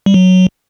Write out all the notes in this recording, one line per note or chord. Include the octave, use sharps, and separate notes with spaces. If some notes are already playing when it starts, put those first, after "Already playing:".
G3
F#3